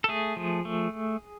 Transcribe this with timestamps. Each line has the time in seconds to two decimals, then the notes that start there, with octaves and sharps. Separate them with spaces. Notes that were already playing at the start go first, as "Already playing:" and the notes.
0.04 A4
0.09 A3 G#4
0.37 F3
0.65 A3